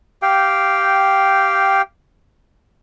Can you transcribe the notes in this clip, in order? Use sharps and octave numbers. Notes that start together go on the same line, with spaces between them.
G4 F5 G5